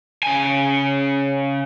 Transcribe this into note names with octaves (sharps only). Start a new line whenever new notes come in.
C#3 G#5